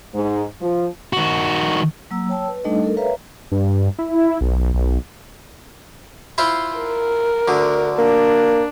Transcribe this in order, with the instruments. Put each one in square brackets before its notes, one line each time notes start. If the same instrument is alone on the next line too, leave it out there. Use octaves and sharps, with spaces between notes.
[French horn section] G#2
F3
[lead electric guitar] D#3 F#4
[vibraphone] F#3 A#3 A#5 E6
C#5 G5 A5 E6
B4
G3 A3 D4 D#4 A4 D#5
A4 A#4
B4 C#5 E5 F5 A#5
[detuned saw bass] G2
E4
B1
B1
[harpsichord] E4 F4 C5
[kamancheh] A#4
[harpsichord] D2 D3
[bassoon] A#3 [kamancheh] D4